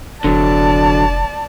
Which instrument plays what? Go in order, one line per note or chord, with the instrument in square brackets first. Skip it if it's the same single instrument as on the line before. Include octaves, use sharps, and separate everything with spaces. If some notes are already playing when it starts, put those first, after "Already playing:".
[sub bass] F1 [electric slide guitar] D3 F#3 [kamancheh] D5 A5